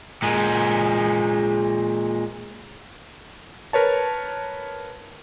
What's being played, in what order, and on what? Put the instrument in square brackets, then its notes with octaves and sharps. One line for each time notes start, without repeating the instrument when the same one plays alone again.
[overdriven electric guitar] A#2 G#3
[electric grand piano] A#4 B4 C#5 A5